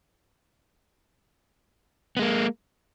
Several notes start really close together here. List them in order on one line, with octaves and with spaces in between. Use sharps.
B3 G#3 A#3